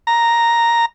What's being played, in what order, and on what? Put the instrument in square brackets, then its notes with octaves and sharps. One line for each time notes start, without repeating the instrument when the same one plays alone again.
[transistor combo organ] A#5